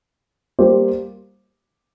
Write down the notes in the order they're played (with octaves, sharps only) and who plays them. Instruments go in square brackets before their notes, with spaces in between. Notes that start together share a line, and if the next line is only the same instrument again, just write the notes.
[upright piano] G3 A#3 G4 C5